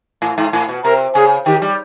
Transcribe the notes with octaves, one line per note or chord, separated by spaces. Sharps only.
A2
G#2
A2
B2
C3 A#4
C#3 G#4
D#3 G4
G3